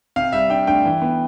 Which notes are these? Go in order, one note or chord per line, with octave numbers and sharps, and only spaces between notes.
C3 F5
G3 E5
D4 G5
D2 G5
E3
B3